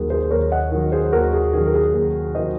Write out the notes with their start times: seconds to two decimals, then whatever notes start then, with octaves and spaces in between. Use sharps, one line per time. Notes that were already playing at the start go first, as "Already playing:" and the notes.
Already playing: D#2 D#3 F#3 G#4
0.10 G#4 C5
0.30 D#2 A#4 C#5
0.51 D#5 F#5
0.72 D#3 F#3
0.92 G#4 C5
1.12 D#2 F#4 A#4
1.33 G#4
1.53 D#3 F#3 G#4
1.66 A#4
1.74 G#4
1.94 D#2 G#4
2.35 D#3 F#3 C5 D#5